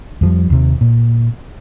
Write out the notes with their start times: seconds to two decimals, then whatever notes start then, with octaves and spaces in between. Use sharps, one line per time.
0.21 F2 F3 G3
0.50 D#2 C3
0.81 A#2